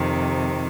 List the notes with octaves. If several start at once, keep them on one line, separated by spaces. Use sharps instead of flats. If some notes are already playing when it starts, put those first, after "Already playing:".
Already playing: F2 C3 D#3